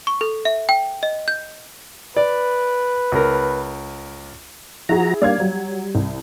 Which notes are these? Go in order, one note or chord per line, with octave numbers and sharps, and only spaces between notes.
C#6
A4
E5
G5
D#5
G6
B4 D5
C#2 A#4
F3 E4 F#4 G#4 A#5
G3 A#3 D4 D5 F5 G#6
F#3 G3
C2